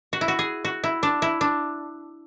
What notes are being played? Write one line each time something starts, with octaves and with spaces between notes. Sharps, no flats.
F#4
E4
F#4
G#4
F#4
E4
D4
E4
D4